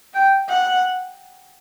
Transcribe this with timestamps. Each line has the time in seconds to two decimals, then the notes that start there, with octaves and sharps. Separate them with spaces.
0.14 G5
0.48 F#5